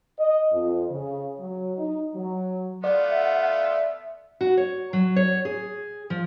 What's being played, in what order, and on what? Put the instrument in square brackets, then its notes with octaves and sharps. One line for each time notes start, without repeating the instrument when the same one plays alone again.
[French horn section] D#5
F2
C#3
F#3
D#4
F#3
[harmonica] A3 B3 F4 [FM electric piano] D5 [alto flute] F#5
[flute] E5
[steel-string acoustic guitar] F#4
C#5
F#3
C#5
G#4
F3